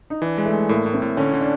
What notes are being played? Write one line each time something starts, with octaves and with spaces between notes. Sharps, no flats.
D#4
E3 D4
G#3
A3
G#3
A2 A#3
A2
C4
A2
D3 C#4
D3
D4